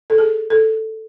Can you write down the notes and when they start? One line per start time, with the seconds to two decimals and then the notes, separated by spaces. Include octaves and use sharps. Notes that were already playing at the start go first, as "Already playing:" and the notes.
0.10 A4
0.18 G#4
0.50 A4